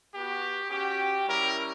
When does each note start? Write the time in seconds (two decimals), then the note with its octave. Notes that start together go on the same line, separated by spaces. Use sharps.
0.13 B3 F#4 G4
0.70 C#4 F#4 G4
1.26 G3 C#4 E4 A#4